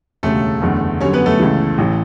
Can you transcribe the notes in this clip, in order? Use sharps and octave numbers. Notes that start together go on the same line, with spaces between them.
E1 D2 C#3 G3 A3 A4
F#1 E2 D3 A3
F#2 D3 G3 C#4 C#5
B3 B4
A3 A4
C#2 C#3 E3
A1 E3